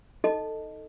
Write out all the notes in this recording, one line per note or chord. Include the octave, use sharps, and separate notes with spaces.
D#4 A4 D#5